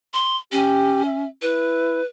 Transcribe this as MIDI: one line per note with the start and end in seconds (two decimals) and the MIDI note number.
0.14 0.37 84
0.52 1.24 61
0.52 1.02 67
1.06 1.28 76
1.42 2.01 64
1.42 2.05 71